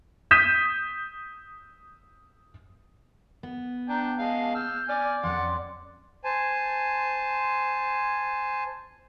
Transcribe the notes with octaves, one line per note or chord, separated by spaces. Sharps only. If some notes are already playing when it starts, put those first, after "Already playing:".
D#6 G6 B6 D#7 E7
B3
D4 G5 A#5
G#3 F5 A5
E6 F6 G6
D5 G#5 F6
F2 C#4 F#5 C6
C5 G#5 A5